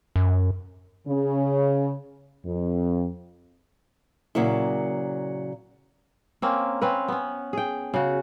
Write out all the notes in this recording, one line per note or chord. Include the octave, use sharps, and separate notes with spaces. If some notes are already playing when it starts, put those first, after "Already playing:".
F#2
C#3
F2
A#2 C#3 F#3 A#3 E4
A#3 C4 C#4
C4 C#4 B4 F5
B3 C#4
G#4 G5
C#3 F#4